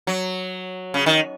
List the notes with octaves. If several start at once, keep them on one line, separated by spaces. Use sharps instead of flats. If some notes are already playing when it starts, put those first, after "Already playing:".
F#3
C#3
D#3